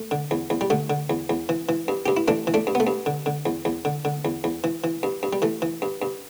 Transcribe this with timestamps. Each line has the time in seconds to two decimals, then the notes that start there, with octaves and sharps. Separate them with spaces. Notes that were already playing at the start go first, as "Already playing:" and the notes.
Already playing: A3
0.11 D3
0.31 E2
0.50 E2
0.61 G3
0.70 D3 A3
0.90 D3
1.10 E2
1.30 E2
1.49 E3
1.69 E3
1.88 G2
2.06 G2 G4
2.17 E4
2.28 E3 A3 D4
2.47 E3
2.54 A3 D4
2.67 G2
2.75 B3
2.80 A3
2.87 G2
3.06 D3
3.26 D3
3.46 E2
3.65 E2
3.85 D3
4.05 D3
4.25 E2
4.44 E2
4.64 E3
4.84 E3
5.03 G2
5.23 G2
5.33 G3
5.42 E3 A3
5.62 E3
5.82 G2
6.02 G2